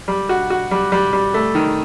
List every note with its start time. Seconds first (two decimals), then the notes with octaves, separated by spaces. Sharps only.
0.08 G3
0.29 F#4
0.50 F#4
0.71 G3
0.92 G3
1.13 G3
1.34 A3
1.55 D#3